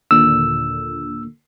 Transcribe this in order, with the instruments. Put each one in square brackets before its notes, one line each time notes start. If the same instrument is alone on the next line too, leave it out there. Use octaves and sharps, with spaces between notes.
[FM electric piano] D#2 A#2 D3 [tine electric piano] E6